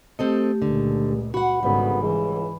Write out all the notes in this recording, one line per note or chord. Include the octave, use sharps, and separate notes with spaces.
A3 C4 G4 A4 D#5
C#2 A#2 D3
F#4 F#5 B5
G#1 D2 C#3 F#3 G3 B3
C#2 E3